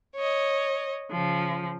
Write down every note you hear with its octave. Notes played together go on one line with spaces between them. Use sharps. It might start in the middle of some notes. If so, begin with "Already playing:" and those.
C#5 D#5
C#3 F3